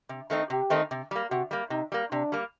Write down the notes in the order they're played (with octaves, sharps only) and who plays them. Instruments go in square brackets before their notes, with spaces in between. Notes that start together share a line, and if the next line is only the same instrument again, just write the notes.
[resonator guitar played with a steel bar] C3
D#3 A3 C4 D#4
[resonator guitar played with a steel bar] C3 [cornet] G4
[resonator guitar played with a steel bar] D#3 A3 C4 D#4
C3
G3 A#3
[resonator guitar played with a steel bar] C3 [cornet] F#4
[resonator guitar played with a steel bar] G3 A#3
[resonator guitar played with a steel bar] C3 [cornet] D#4
[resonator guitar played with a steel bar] G3 A#3
[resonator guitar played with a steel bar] C3 [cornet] D4
[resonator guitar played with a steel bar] G3 A#3